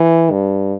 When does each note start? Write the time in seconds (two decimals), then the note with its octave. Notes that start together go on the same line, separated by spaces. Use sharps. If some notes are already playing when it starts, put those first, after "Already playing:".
Already playing: E3
0.31 G2